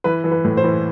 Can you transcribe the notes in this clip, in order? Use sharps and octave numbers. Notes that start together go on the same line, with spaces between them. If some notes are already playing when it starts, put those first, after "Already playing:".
E3 B4
E3
B4
A2
C5
E3